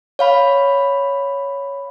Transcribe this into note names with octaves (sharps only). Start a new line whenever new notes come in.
C#5 F5 B5